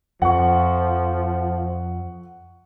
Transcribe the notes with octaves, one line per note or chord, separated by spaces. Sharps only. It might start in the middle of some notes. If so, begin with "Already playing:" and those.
F2 F3 F#5 C#6